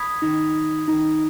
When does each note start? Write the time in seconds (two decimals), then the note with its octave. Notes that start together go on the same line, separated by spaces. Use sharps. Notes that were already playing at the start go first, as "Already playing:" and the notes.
Already playing: B5 D#6 G#6 B6
0.22 D#3
0.88 D#3